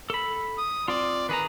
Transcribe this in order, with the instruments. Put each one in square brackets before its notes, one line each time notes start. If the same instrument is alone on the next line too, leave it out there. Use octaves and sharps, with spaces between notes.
[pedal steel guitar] A4 B5
[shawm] D#6
[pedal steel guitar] C4 F4 [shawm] D5
[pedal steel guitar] D#3 G#4 A#5 [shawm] B4